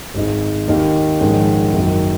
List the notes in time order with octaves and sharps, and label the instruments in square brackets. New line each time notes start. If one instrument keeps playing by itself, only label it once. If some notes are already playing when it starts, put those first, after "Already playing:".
[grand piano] G#1 G#2 G#3 D#4
D#2 D#3 A#3 D#4
A#1 G#2 D#3 G#3 C#4
F#1 F#2 D#3